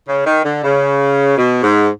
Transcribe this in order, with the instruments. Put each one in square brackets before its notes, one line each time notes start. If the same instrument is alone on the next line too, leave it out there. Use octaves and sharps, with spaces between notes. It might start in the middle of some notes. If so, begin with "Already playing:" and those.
[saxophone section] C#3
D#3
D3
C#3
B2
G#2